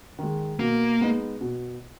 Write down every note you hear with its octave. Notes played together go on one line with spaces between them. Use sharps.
D#3 G#3
B2 A#3
G#3 B3 D#4
B2